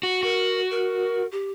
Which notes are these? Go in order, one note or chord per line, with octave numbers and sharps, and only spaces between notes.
F#4
F#4 A#4
A#4
G4